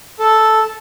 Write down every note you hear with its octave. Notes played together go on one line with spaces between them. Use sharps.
A4